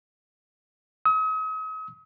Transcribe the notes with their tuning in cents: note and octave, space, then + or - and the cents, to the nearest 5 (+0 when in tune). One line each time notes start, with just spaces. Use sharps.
D#6 +40